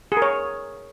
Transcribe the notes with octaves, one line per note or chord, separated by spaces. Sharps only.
G#4
A#4
C#5